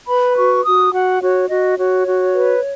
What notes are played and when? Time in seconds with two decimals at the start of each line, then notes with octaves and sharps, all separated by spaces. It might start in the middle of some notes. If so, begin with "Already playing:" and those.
0.07 B4 B5
0.37 F#4 C#6
0.65 F#4 D#6
0.93 F#4 F#5
1.21 F#4 C#5
1.49 F#4 D#5
1.78 F#4 C#5
2.06 F#4
2.35 B4